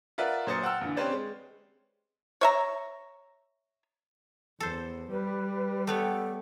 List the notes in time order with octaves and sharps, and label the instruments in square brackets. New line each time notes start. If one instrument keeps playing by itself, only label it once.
[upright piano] F4 A#4 B4 D5 E5 F#5
A#2 F#3 C5 D#6 A6 C#7
F#5 G5 E6 F6
A#1 D3 E3
C4 C#4 G4 B4 C5 D5
G#3
[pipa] C#5 E5 A#5
[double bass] E2 [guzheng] A4 C5
[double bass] G3 [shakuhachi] B4
[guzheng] A3 B3 C#5 [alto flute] A4 [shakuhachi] G5